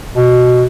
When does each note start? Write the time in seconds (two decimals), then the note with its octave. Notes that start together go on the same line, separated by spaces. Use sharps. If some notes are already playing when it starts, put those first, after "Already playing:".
0.16 B2